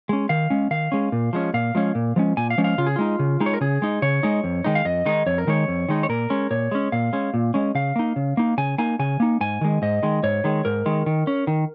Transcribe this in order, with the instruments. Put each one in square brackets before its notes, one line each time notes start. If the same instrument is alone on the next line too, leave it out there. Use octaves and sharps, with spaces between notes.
[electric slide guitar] G#3 C#4
D#3 F5
G#3 C#4
D#3 F5
G#3 C#4
A#2
F3 G#3 C#4
A#2 F5
F3 G#3 C#4
A#2
F3 G#3 C#4
A#2 G#5
F5
F3 G#3 C#4
F5
C#3 F4
G#4
G#3 D#4 F4
C#3
G#3 D#4
C#5
A#4
C#3 G#4
G#3 D#4
C#3 C#5
G#3 D#4
F2
D#3 G#3 D#4
F5
F2 D#5
D#3 G#3 D#4
F2 C#5
A#4
D#3 G#3 D#4 C#5
F2
D#3 G#3 D#4
C#5
A#2 A#4
G#3 C#4
A#2 C#5
G#3 C#4
A#2 F5
G#3 C#4
A#2
G#3 C#4
C#3 F5
A#3 D#4
C#3
A#3 D#4
C#3 G#5
A#3 D#4 G#5
C#3 G#5
A#3 D#4
G#2 G#5
D#3 G#3
G#2 D#5
D#3 G#3
G#2 C#5
D#3 G#3
G#2 A#4
D#3 G#3
D#3
C#4
D#3